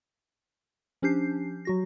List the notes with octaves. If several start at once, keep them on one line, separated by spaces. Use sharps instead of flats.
F3 C#4 D4 G4 G6 C7
F#3 F#4 A#6